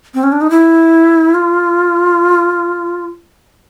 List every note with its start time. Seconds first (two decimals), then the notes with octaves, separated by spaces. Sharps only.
0.14 C4
0.23 C#4
0.32 D4
0.41 D#4
0.50 E4
1.34 F4